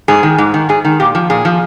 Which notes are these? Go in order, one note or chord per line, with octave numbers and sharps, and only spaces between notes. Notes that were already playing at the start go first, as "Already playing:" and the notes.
G#2 G#4
D#3
G#2
D#3
G#2 G#4
D#3
A#2 G4
F3
A#2 G#4
F3